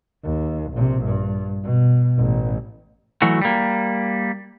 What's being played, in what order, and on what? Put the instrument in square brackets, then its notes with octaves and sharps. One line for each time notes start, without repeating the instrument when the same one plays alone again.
[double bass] D#2
A#1 C3
G2
B2
A1
[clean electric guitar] E3 F#3 A3 F#4
G3 A#3